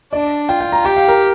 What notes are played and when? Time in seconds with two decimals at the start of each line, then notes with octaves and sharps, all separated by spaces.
0.13 D4 D5
0.49 F4 G5
0.60 G5
0.72 A#5
0.85 G4 G5
0.96 F5
1.08 A#4